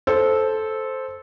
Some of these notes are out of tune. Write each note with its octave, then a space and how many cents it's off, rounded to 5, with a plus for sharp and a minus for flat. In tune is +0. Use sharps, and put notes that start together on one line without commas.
A4 -10 C5 +0